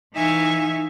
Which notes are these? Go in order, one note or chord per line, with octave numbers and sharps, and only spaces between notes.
E3 D#4 E5 F5 G#5 C#6